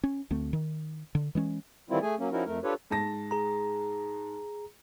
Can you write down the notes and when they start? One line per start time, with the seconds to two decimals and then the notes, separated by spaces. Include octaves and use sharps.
0.04 C#4
0.31 D2 A3 C4
0.53 D#3
1.15 D3
1.35 E3 G#3 C#4
1.90 D#3 E3 G3 C4 E4 F4
2.02 A3 G#4 G#5
2.19 F#3 A#3 C#4
2.32 F3 C#4 D#4 E4 F#4 A#4
2.46 F2 A3 A#4
2.64 D4 F4 G4 A4 B4 C#5
2.90 G#2 A5 A#6
3.31 G#4 A#5